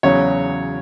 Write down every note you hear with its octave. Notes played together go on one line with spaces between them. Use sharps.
E2 C#3 F#3 C#5